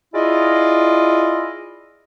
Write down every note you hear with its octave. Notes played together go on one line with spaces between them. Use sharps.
E4 F4 G#4 D5 D#5